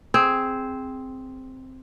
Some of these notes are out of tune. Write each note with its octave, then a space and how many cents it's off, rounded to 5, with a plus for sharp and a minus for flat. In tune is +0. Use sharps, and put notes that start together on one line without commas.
C4 +0 G#4 +0